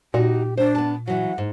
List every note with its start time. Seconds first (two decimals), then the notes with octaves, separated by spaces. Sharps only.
0.14 A#2 D#4 F#4 G4
0.57 D4 C5
0.75 B3 A5
1.07 E3 F#3 F#5
1.38 G#2